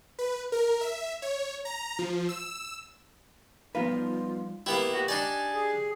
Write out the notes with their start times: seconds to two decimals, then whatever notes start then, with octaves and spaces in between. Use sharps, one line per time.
0.19 B4
0.52 A#4
0.81 E5
1.22 C#5
1.65 A#5
1.99 F3
2.29 E6
3.75 F3 G3 B3 D#4 F4 B4 F5
4.66 A#3 B3 E4 G4
4.94 F#4 G4
5.08 D4 D#4 D5 G#5
5.55 G#4